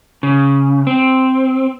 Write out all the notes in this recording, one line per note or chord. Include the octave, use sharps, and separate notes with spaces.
C#3
C4